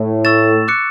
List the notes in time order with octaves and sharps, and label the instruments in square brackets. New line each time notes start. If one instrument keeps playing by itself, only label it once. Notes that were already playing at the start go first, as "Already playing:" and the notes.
Already playing: [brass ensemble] A2
[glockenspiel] C#6 E6 A6 E7
D6 F#6 C#7